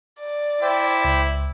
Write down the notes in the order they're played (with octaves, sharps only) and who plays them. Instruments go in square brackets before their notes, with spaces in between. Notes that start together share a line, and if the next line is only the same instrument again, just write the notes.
[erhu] D5
[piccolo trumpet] E4 [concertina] C5 G5 D6
[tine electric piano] C#2